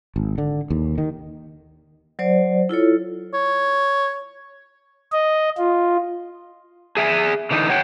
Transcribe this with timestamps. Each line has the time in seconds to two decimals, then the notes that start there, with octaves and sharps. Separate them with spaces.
0.16 G#1
0.38 D3
0.70 D#2
0.98 D#3
2.19 F#3 C5 D5
2.69 E4 F4 A4 C#5
3.34 C#5
5.12 D#5
5.58 F4
6.97 G#4 E5 G5 G#5
7.51 D3 E3 D#4
7.69 C#5 F#5 G5